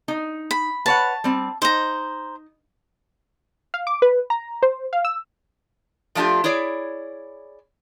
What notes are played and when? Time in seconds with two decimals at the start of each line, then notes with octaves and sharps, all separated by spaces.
0.08 D#4
0.51 B5
0.86 B4 C#5 F#5 A5
1.24 G3 C4
1.62 D#4 C5 A#5
3.74 F5
3.87 D6
4.02 B4
4.30 A#5
4.63 C5
4.93 F5
5.05 E6
6.15 F3 A3 D4 E4 F4 G4
6.44 E4 G#4 C#5 D5